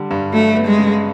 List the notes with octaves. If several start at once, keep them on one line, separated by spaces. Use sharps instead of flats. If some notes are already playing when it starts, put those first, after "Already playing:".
Already playing: D3 G3
G2
F#3 A3
B3
G#3
C#3